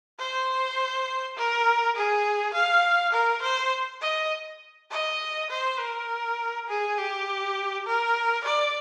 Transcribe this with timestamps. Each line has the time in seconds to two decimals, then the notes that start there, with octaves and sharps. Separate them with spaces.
0.19 C5
1.36 A#4
1.96 G#4
2.54 F5
3.13 A#4
3.42 C5
4.01 D#5
4.91 D#5
5.50 C5
5.80 A#4
6.68 G#4
6.97 G4
7.86 A#4
8.44 D5